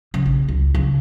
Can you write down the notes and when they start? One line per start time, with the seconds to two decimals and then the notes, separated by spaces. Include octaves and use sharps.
0.14 C#3
0.26 A#1
0.49 C#2
0.75 C#3